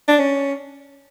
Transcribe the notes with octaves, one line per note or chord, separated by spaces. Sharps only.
D4
C#4